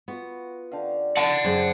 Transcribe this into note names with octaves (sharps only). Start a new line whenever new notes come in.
B3 F4 F#4
D3 G4 F5
F#5 A5
F#2 G4 G#4 C5